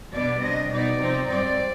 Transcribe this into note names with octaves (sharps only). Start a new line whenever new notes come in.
B2 G3 B3 D4 D5
C3 G3 D4 D#5
B2 B3 D#4 D5
C3 F3 C4 D#4
G#2 G3 C4 D5